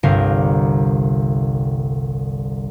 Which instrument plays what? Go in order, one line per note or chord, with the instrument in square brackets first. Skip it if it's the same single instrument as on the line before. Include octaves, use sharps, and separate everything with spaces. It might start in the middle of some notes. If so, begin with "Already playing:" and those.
[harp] G1 C2 D4 A#4 F5